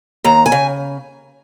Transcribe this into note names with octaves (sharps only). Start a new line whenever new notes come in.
D#2 A#5
G#5
C#3